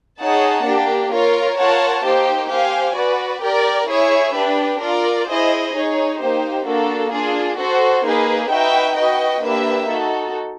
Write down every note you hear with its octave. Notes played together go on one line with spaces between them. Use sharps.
D#4 G#4 C#5 F#5 A5
A#3 D4 G4
F4 A#4 C#5
F4 A#4 C#5 F#5 A5
A#3 D#4 G4 C5
G4 C5 F5 G#5
F#4 B4 D5
G4 A#4 D5
E4 G#4 C#5 E5
D4 G4 B4
F4 A#4 D5
E4 G#4 C5 D#5
D#4 G#4 C#5
A#3 D#4 G4 C5
A#3 D4 F#4 A4
D4 F4 G#4
F#4 A4 C5
A#3 D#4 G#4 B4
D#4 F#4 B4 E5 G5
F#4 B4 D#5 G5
A#3 D4 G4 B4 E5
D#4 F#4 A4